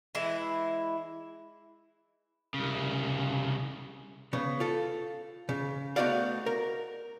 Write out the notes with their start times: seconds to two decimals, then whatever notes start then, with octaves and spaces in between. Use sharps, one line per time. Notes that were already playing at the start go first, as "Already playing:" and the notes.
0.15 E3 G#3 E4
2.54 C2 C#3
4.33 C#3 B3
4.60 F4 A4
5.49 C#3
5.96 A3 B3 D#4 F#4 D5 F5
6.46 A#4